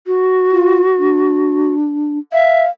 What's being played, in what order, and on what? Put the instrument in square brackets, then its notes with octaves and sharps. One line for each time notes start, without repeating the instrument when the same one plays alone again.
[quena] F#4
[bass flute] F4
D4
[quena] E5 [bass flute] F5